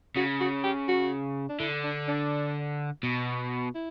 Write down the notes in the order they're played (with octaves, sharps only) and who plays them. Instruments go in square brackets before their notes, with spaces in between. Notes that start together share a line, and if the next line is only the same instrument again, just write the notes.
[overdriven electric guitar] C#3 [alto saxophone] F#4
[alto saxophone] F#4
G4
F#4
D4
[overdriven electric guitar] D3 [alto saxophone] E4
[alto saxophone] D4
D4
[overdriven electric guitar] B2
[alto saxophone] E4